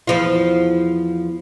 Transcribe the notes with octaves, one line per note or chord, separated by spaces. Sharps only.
E2 F3 F4